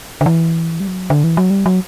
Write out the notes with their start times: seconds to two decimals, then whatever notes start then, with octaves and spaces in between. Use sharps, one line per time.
0.21 D3
0.26 E3
0.80 G3
0.87 F#3
1.10 D3
1.24 E3
1.37 F#3
1.50 G3
1.66 F#3